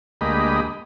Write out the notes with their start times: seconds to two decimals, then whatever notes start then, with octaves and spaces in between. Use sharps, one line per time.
0.21 D2 G#3 A#3 G4 D#5 B5